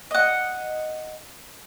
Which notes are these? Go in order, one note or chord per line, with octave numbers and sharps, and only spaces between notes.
D#5 F#5